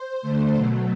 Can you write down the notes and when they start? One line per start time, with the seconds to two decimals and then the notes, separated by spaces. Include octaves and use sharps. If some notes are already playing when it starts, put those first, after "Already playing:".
Already playing: C5
0.22 D3 A3
0.54 B2 F#3 A3